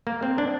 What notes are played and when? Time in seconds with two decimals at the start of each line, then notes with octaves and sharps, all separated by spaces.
0.07 A#3
0.23 C4
0.38 D4